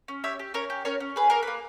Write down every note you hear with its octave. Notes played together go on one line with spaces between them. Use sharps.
C#4
G4 C#5 E5
G4
C#4 A#4 C#5
G4
C#4 A#4 C#5
C#4
G#4 B4
A#3 A#4
A#3 B4